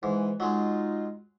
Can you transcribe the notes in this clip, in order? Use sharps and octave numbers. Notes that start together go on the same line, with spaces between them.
G#2 E3
F#3 G#3 D#4 F4